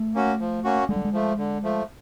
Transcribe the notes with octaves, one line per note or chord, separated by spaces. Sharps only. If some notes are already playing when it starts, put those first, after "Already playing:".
Already playing: A3
A#3 C#4 F#4
F3
A#3 C#4 F#4
D3 G#3
G3
G#3
F3 A3
D3
F3 A3